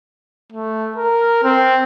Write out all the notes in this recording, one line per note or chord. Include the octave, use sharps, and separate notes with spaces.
A3
A#4
C4